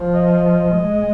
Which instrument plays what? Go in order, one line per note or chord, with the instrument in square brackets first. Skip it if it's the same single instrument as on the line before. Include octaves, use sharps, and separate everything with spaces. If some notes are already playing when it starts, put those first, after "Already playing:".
Already playing: [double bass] F3
[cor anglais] D#5
[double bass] G#3